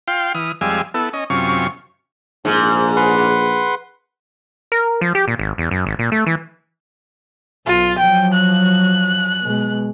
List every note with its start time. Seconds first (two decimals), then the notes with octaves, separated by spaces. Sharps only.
0.08 F4 F5 G5 C6
0.35 E3 D#6 F6
0.61 F2 G3 G#3 F5 G#5 E6
0.94 B3 E4 A4
1.13 C#4 D#5
1.30 F#2 C3 C#4 F4 C#6
2.45 A#1 G#2
2.96 B4 F#5 C6
4.72 A#4
5.01 F3
5.15 G4
5.28 A#2
5.39 G#1
5.58 E2
5.71 F#2
5.86 G#1
5.99 A#2
6.12 A3
6.26 E3
7.66 B1 F4
7.98 F3 F#3 G5
8.33 F#6
9.42 B2 G#3